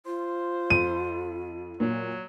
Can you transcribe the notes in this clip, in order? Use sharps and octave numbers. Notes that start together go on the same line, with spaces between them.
F4 C5
F2 D#7
A#2 F#3